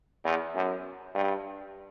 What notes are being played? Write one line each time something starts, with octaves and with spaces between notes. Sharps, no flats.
E2
F#2
G2